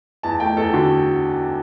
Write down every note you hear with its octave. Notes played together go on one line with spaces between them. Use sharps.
E2 A5
A3 G5
E2 A4
D3 F#4